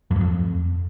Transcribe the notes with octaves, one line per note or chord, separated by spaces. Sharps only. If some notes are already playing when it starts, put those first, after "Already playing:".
F2
F#2
F2